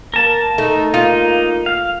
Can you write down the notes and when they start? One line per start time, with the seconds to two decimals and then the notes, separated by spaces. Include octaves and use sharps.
0.14 A#3 A#4 A5
0.58 A3 D#4
0.94 A#3 D#4 F4
1.66 F5